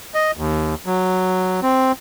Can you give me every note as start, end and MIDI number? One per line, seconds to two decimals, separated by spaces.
0.14 0.31 75
0.37 0.74 39
0.86 1.60 54
1.63 1.92 60